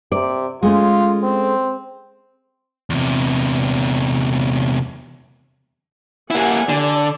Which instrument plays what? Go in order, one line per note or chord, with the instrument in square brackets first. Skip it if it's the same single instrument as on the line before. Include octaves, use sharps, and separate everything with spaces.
[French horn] C3 [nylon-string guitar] D5
[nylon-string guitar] G#3 A3 C#4 [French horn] F4
[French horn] C4
[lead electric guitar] E2 C3
[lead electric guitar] A#3 E4 [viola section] G4 F#5 G#5
[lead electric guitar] D3 [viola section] D5